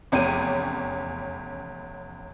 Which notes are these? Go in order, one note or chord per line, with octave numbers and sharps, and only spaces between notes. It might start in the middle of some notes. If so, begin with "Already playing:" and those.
F1 E2 C#4 C#5 G5 D#7